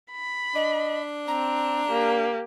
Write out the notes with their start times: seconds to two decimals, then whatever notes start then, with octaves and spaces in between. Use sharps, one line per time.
0.11 B5
0.55 D4 D#5
1.28 C4 A#5
1.88 A#3 G4